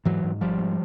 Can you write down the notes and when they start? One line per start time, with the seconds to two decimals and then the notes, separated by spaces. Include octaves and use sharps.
0.05 G#2 E3 F#3
0.24 G#2
0.41 G#1 F3 G3
0.59 G#2